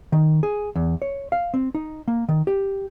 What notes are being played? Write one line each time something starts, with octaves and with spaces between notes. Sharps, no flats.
D#3
G#4
E2
C#5
F5
C4
D#4
A#3
D#3
G4